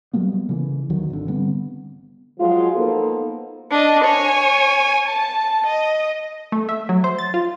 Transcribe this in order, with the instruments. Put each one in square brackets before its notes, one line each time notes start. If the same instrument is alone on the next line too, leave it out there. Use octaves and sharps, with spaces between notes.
[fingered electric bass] F#3 G3 A#3 B3
C#3 E3
D2 D#3 F#3
G#1 D3
D3 G3 B3 C4
[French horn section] F3 F#3 G#3 F4
A#3 B3 D#4 A4 C5
[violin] D4 D#5
C#5 G#5
A5
D#5
[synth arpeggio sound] A3
E5
F#3
C5
A6
F4